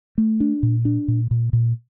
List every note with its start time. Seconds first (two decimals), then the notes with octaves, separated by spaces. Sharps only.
0.18 A3
0.40 D4
0.63 A#2
0.85 D4
1.08 A#2
1.31 A#2
1.53 A#2